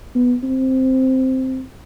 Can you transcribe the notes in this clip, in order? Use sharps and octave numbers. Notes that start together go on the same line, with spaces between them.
B3
C4